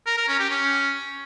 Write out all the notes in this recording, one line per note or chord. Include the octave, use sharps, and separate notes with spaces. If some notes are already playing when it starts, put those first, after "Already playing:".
A#4
A#4
C#4
G4
C#4